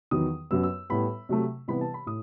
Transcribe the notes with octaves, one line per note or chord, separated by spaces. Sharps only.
E2 D#3 F#3 B3 D#6
F#2 F#3 B3 E6
E6
A2 G3 B3 B5
C3 F#3 A3
C3 E3 G3 B3 B5
A5
B5
A2 D#6